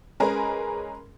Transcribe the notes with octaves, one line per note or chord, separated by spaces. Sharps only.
G#3 C#4 G#4 A#4 B4